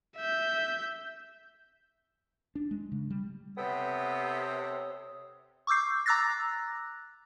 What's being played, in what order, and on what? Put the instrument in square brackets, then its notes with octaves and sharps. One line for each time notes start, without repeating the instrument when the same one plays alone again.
[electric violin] E5 G6
[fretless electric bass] D4
G#3
C#3
G3
[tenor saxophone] C3 [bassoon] B3 [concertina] A4 G5 [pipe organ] C#5 D#6
[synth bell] C#6 D6 E6 G6 C7
A#5 D6 E6 F#6 A6 A#6